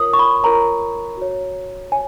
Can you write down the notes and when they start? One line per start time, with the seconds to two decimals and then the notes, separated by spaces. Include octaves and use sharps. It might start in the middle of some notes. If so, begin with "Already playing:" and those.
Already playing: F4 A#4 C#5 D#6
0.13 C#6
0.19 B5
0.43 F4 A#4 C#5 A#5
1.17 F#4 C#5
1.92 C#5 G#5